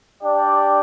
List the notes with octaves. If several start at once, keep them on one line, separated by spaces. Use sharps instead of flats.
D4 G4 D5 G5